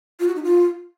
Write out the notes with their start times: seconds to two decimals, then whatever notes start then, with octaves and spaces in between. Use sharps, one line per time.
0.20 F4
0.28 F#4
0.35 D#4
0.43 F4